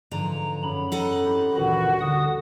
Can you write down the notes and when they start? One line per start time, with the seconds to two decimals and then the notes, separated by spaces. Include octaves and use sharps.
0.12 G#2 D3 E3 F3 A#5
0.63 F#2 C#4 B5
0.92 D#4 A4 F#5
1.25 C4 E4 G4
1.57 D2 A#2 D#3 E3 G3 F#4
2.01 D3 D#6